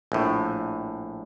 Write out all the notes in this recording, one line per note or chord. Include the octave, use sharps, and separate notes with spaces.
A#1 A2